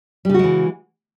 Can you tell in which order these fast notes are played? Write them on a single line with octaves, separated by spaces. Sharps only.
G3 C#3 F#4 G#3 E3